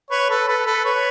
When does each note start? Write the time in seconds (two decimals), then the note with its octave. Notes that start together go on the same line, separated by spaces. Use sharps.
0.10 B4 C#5
0.30 A4 B4
0.48 A4 B4
0.66 A4 B4
0.85 B4 C#5